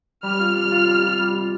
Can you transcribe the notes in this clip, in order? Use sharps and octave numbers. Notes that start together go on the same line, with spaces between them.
G3 F6
F4
G3 F6
F4
G3
F4
G3
F4